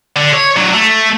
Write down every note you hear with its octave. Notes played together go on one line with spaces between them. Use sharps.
D3
C#5
D3 F#3
A3